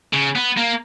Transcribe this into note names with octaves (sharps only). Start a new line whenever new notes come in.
C#3
B3
A#3